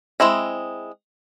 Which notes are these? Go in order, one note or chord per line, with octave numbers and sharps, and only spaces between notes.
G#3 C4 E4 D#5